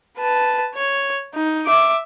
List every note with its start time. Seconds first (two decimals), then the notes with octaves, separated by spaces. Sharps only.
0.17 B4 A5
0.75 C#5
1.34 D#4
1.67 E5 D6